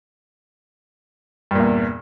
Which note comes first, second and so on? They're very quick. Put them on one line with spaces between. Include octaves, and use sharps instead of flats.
G2 A#2 E2